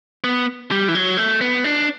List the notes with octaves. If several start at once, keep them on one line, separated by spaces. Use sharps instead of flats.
B3
G3
E3
F#3
A3
B3
D4